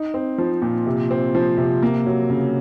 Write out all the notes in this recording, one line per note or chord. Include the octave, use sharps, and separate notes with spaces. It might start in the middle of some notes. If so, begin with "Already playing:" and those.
Already playing: D#4
C4
F3
A#2
C3
C4
F3
C3
A#3
F#3
C#3